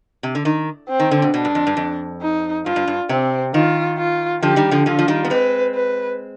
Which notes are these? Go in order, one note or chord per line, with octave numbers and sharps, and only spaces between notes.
C3
D3
D#3
C4
D#3
D3
B2
B2 D4
G2
F2
G2
F2
D#4
G2 F4
G2
G2
C3 C4
D#3 F4
F4
D3 F3 G4
D#3 G3
D3 F3
D3 F3 F4
F3
D#3 G3
B3
G#3 C4 B4
B4